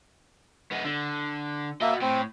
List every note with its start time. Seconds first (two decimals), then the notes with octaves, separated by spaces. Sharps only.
0.72 G#3 B3
0.85 D3
1.81 A#3 F#4 D#5 E5
2.01 A2 C4